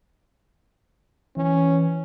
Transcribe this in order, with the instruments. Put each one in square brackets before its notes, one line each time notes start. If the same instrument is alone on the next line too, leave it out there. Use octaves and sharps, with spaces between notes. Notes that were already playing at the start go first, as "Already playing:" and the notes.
[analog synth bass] E3 [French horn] C#4